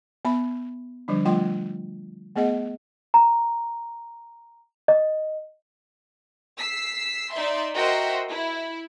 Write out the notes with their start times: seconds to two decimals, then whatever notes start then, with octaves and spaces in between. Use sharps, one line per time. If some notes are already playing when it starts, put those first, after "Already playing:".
0.25 B3 E5 B5
1.08 D3 F3 G3 D4
1.25 F3 G3 A3 F4 G5 C6
2.36 A3 B3 G#4 D#5 F#5
3.14 A#5
4.88 D#5
6.57 E6 B6 C7
7.33 D#4 D5 E5 C6
7.75 F#4 A#4 C5 D#5 E5 G5
8.30 E4